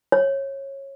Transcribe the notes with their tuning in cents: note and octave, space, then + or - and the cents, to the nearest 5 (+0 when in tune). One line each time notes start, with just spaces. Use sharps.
C#5 -20